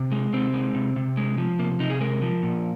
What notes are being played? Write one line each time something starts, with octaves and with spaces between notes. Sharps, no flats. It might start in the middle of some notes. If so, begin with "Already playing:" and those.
Already playing: C3
G#3
C3 C4
G#3
C3
C3
G#3
F3
C3 A#3
C3 D#4
G#4
G#3 A#4
F3
A#2